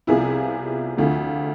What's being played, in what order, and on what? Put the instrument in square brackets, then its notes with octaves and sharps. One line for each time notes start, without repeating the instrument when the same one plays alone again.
[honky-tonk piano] C2 C3 F3 B3 E4 G#4
D2 D3 F3 A3